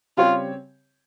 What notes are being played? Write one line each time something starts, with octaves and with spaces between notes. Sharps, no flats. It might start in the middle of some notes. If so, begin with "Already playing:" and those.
C#3 G3 C4 F4 G4 C#5